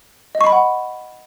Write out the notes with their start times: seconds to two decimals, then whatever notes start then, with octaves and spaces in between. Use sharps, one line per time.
0.35 D#5
0.41 C#6
0.47 B5
0.52 F#5